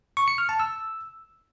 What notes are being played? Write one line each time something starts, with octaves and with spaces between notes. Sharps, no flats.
C#6
C#7
F6
A5
E6